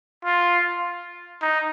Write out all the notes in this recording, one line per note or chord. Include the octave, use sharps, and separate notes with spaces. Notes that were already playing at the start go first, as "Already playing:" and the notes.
F4
D#4